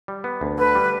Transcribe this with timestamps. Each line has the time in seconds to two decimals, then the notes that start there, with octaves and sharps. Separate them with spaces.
0.08 G3
0.24 B3
0.41 D2
0.58 D3 B4
0.75 G3